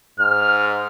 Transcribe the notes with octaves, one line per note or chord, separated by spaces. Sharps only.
G#2 F6